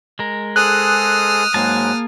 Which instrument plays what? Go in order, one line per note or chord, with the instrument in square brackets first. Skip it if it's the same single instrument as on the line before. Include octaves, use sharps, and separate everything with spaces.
[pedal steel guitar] G#3 A#4
[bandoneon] G#4 A4 C5 [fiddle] D#6 F6 [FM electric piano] F#6
[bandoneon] G#2 F#3 G#3 [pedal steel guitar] A#3 G#4 A5